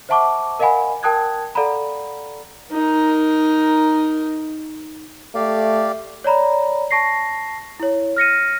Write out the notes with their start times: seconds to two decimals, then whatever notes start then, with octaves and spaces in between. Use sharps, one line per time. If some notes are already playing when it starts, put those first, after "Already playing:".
0.09 C5 E5 F#5 A5 C#6 D6
0.59 A#4 D#5 F5 F#5 G#5 B5
1.03 A#4 G5 A5 D#6 F#6 G#6
1.55 A4 D5 F5 F#5 A#5 B5
2.72 D#4 A#4
5.35 A3 G4 D5 F5
6.24 C#5 D5 A#5 B5
6.91 A5 C#6 A#6 C7
7.80 E4 C#5
8.16 F6 A#6 C#7 D#7